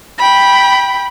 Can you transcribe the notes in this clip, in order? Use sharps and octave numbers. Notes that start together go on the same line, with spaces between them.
G5 B5